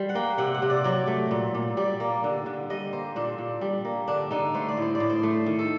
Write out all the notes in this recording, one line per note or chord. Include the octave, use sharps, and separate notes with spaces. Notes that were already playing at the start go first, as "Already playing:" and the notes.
Already playing: G3 C5
F#5
A#3 G5
C3 F#5
F#5
C3
D5
F#3 D5
A3
A#2
A#2
G3 D5
A#3
D3
D3
G3 D#5
A#3 C5
A#2 D4
A#2
G3
A#3
D3 D4
D3 D#4
A3 C5
D5
A2 C5
D5
A2
C5
A3
D#3
A4